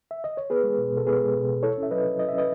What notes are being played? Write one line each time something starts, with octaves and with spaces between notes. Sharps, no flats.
E5
D#5
C#5
B3 G#4 B4
G#3
B2
B2
A4
B3 G#4 B4
G#3
B2
B2
E4 A4 C#5
C#4
E5
F#3 B4 D#5
F#3
E4 D#5
E5
C#4 B4 D#5